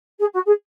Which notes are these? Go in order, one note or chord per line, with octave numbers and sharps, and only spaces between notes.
G#4
F#4
G#4